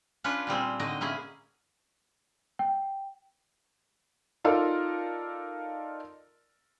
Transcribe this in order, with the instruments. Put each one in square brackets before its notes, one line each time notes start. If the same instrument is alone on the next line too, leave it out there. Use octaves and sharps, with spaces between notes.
[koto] C#4 D4 F4 B4 C#5
A#2 G3 C4 G#4
A2 D3 D#4 F#4 D#5
A#3 C#4 E4 G#4
[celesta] G5
[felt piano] D#4 F4 A4 A#4 D5 F5